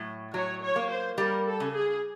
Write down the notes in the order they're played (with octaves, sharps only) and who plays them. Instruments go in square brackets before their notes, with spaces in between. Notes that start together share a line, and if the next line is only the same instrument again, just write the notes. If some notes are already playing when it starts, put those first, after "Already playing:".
Already playing: [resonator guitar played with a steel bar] A2 F#3
[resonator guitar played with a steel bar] F#3 [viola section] C#5
[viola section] C#5
[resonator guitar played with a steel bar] A#3
[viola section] C5
[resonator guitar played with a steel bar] G3 [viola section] A#4
[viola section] A4
[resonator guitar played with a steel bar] C#3
[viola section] G#4